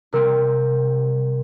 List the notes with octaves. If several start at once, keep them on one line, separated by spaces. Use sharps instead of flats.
C3 G3 C4 A#4